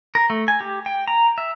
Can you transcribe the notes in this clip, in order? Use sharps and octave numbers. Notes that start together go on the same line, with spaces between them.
A#4
A3
G#5
G4
G5
A#5
E5